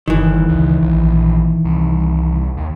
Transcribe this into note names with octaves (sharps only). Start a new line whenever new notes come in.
G1 D#3 E3
C#2
A#1
C2
D#2